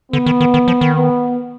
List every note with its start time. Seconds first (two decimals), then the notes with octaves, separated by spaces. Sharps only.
0.12 D3 B3
0.26 D#3
0.41 D#3
0.54 D#3
0.68 F3
0.81 D#3
0.95 B3